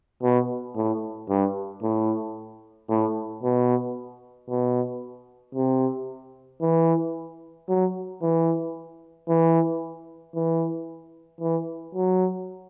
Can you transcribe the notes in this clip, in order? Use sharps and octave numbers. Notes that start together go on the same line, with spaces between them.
B2
A2
G2
A2
A2
B2
B2
C3
E3
F#3
E3
E3
E3
E3
F#3